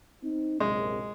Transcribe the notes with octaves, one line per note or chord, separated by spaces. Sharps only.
C4 D#4
A#1 F#2 C3 G#3